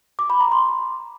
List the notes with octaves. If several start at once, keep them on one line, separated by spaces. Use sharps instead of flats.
D6
B5
A#5
C6